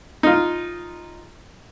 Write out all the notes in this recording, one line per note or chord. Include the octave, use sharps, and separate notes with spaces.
D#4 F4